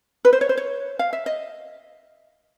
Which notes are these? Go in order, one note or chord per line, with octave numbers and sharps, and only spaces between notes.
B4
C5
C#5
C5
C#5
F5
E5
D#5